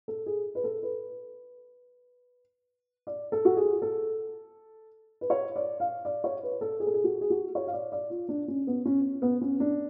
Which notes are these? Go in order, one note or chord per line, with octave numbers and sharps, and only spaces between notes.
A4
G#4
B4
A4
B4
D5
A4
F#4
G#4
A4
B4
C#5
D5
F5
D5
C#5
B4
A4
G#4
A4
G#4
F#4
G#4
F#4
C#5
F5
D5
D5
F4
D4
C#4
B3
C#4
B3
C#4
D4